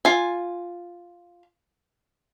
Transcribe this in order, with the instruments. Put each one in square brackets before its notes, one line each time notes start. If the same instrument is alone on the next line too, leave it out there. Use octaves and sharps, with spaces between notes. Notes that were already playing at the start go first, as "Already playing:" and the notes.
[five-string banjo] F4 G#5